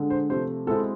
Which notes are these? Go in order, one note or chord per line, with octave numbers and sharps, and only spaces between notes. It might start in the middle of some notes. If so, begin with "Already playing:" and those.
Already playing: D3 G#3 D4
C5
C3 F3 A3 C5
B2 G#3 C4 E4 A4